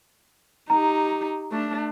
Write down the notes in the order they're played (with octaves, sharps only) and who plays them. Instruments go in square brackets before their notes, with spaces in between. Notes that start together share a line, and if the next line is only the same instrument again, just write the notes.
[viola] D#4 G4 [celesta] A#5
[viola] A3 D4